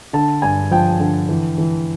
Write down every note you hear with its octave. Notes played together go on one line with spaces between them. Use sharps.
D3 A5
G2 G#5
F3 G5
D3
E3
E3